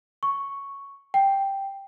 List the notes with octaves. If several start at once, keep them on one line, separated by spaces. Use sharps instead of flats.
C#6
G5